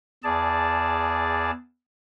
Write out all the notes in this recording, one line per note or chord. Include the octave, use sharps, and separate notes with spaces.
E2 G#4 D5 A5